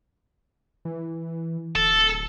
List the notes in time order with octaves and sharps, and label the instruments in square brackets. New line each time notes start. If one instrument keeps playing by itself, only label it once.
[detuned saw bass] E3
[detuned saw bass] D1 [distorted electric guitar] A4